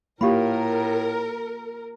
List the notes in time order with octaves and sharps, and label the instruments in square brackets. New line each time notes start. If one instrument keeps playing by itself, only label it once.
[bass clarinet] A2 [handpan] A#3 F4 [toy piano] G4 F5 B5 [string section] A#4